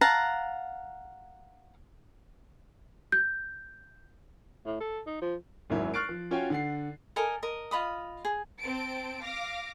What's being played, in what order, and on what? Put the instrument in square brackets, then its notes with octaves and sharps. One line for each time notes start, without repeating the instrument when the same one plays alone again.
[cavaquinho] F5 F#5 A5 A#5
[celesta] G6
[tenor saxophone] A2
A4
D#4
F3
[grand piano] G#1 F#2 F#3 E4
C#6 F6 F#6 A6 C7 D7
F3
C#4 F4 F#4 C#5 G5 G#5
D3 F#5 C7
[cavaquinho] A4 A#4 D#5 G#5
A#4 D#5
F4 D#5 B5 D#6
G#4
[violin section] C4 A5 D7
F5 D6 A#6